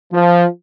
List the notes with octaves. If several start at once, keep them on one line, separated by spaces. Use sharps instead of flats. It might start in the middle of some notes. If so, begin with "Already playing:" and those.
F3